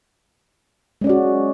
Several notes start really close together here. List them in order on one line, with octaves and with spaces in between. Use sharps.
G#3 C#4 D5 F#4